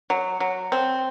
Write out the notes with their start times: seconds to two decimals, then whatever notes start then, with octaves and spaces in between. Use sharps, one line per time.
0.10 F#3
0.40 F#3
0.72 C4